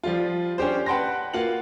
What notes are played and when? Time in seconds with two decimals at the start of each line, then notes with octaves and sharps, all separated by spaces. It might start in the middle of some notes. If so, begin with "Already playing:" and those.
0.04 F3 G3 F4
0.58 C#4 D4 G4 C5
0.86 B4 F#5 G5 A5 C6 A#6
1.33 A#3 F4 F#4 F#5 F#7